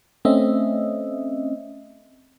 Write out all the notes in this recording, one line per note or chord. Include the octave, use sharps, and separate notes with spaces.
A3 C4 C#4 D#5 E5